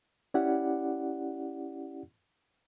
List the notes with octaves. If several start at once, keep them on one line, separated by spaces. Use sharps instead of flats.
C#4 E4 G4 D5 F#5